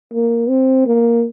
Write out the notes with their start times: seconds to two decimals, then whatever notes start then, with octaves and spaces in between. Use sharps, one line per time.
0.14 A#3
0.49 C4
0.87 A#3